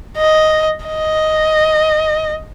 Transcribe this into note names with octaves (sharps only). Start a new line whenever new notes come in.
D#5
D#5